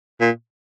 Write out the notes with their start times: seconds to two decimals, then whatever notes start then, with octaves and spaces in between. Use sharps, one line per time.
0.21 A#2